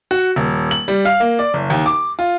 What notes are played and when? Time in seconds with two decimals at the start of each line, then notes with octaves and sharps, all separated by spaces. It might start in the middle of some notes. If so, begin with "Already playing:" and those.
0.11 F#4
0.36 D#1
0.71 F#7
0.88 G3
1.05 F5
1.20 A#3
1.39 D5
1.54 F#1
1.70 D#2
1.86 D6
2.19 F4